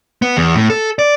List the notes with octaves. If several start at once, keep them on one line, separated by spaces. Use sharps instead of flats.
B3
E2
A2
A4
D5